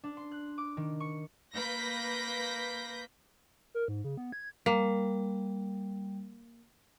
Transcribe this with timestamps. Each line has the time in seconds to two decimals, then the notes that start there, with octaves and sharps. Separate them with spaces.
0.04 D4
0.17 C6
0.32 F#6
0.58 D6
0.77 D#3
1.00 C#6
1.54 A#3 B4 G6 A#6 B6
3.74 A#4
3.88 G#2
4.04 C#3
4.17 B3
4.32 G#6
4.66 G3 A#3